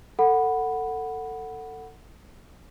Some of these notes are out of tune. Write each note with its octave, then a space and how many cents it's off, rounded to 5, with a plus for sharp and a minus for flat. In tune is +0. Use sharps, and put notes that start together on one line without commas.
A4 +25 F#5 +0 B5 +0